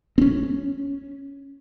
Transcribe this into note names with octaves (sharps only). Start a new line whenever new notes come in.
C4 C#4